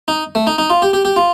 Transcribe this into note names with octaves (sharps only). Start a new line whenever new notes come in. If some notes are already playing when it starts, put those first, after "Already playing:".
D#4
A3
D#4
D#4
F4
G4
G4
G4
F4